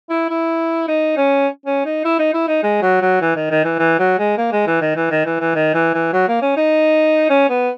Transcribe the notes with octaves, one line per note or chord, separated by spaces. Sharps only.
E4
E4
D#4
C#4
C#4
D#4
E4
D#4
E4
D#4
G#3
F#3
F#3
E3
D#3
D#3
E3
E3
F#3
G#3
A#3
G#3
E3
D#3
E3
D#3
E3
E3
D#3
E3
E3
F#3
A#3
C#4
D#4
C#4
B3